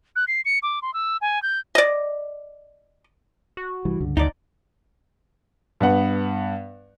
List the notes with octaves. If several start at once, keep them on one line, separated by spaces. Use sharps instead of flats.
F#6
C7
C#7
D6
C6
E6
G#5
G6
D5 D#5
F#4
C2 E3 G3
C#2 G2 D3
D2 D#4 D5
G2 B3 F#5